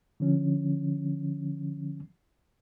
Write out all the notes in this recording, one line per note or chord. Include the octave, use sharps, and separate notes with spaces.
D3 F3 C#4